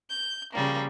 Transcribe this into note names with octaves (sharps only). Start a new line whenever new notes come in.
G6
C#3 F3 G3 A#3